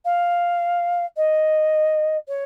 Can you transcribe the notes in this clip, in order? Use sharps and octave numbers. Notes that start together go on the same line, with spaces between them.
F5
D#5
C#5